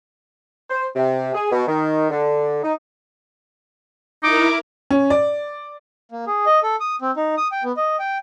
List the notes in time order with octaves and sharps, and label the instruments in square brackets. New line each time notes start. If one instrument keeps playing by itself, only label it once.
[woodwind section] C5
C3
G#4
B2
D#3
D3
D#4
[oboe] D#4 [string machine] E4 A#4 [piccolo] D6
[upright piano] C#4
D5
[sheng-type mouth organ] A#3
G#4
D#5
A4
D#6
C4
D#4
D#6
G5
B3
D#5
G5